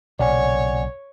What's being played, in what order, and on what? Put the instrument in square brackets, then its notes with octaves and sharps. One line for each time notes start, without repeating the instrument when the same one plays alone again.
[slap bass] B1 A#2 C#3 [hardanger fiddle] C#5 [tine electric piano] D5 F#5 G#5